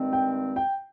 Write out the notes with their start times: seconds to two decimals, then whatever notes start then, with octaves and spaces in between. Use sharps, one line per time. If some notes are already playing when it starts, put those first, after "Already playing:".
Already playing: G2 D#3 G#3 C4
0.13 G5
0.56 G5